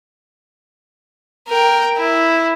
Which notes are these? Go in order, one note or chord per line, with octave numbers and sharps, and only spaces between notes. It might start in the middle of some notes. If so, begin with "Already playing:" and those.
A#4 G5
E4